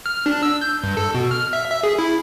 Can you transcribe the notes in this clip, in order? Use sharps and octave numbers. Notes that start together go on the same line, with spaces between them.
F6
D4
E6
G6
G2
A4
B2
F6
E5
E5
G#4
E4